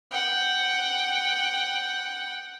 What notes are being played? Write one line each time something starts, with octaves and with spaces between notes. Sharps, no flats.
F#5 G5